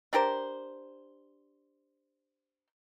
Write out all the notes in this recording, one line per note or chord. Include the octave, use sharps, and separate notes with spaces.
D4 G4 A#4 C5